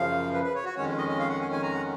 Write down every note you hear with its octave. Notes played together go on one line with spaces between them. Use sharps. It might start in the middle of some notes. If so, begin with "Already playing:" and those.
Already playing: F#2 C#3 F3 F5
B4
B4
C#5
F#4
F2 D#3 G#3 C#4 C#5
D#5
D#5
F5
F#5
G#5
G#5
A#5
F#5